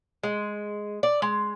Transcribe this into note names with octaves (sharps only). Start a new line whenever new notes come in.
G#3
D5
G#3